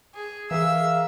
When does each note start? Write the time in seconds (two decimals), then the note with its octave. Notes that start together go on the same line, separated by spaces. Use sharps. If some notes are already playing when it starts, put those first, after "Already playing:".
0.15 G#4
0.51 E3 G#4 A#4 E5 F5 E6